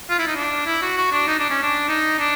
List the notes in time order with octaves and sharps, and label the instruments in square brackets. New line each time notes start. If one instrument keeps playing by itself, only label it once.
[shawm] F4
E4
D#4
D4
E4
F#4
F#4
D4
D#4
D4
C#4
D4
D#4
D4